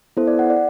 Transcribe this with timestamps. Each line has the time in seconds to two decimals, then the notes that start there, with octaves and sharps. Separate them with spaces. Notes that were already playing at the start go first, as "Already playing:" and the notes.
0.17 B3 E4 A4 C5
0.27 D5
0.39 F#5
0.50 D5